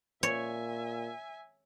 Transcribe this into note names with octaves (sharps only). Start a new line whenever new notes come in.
A#2 C#5 E5 G#5